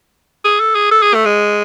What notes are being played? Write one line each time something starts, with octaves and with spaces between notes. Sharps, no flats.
G#4
A4
G#4
A4
G#4
A3
G#3